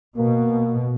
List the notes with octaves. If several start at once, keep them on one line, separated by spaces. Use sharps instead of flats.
B2 A#3